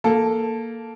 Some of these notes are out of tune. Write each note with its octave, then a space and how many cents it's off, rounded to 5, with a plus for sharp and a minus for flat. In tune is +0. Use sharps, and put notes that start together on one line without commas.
A#3 -5 A4 +0